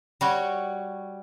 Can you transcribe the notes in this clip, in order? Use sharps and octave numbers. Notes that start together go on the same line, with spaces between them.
G3 F#4 C#5